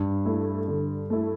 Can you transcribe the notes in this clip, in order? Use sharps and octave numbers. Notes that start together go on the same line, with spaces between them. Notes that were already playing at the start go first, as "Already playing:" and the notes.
Already playing: G2
A3 E4
D3
A3 E4